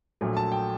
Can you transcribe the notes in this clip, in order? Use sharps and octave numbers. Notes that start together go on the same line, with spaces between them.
A#1 A#2 F#3 A3
A5
G5